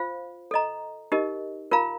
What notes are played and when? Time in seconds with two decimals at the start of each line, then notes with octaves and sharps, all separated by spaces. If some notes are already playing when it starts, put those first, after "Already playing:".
Already playing: F4 C5 F5
0.51 A4 D#5 A#5
1.12 D#4 G4 A#4 D#5
1.71 F4 A#4 F5 A#5